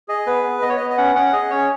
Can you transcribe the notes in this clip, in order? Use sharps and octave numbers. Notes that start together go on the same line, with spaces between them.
G#4 D#5
B3 B4
B3
B3 D#5
C#5
B3 D#5
D#5
C#4 F#5
C#4 F#5
G#4 D#5
C#4 C#5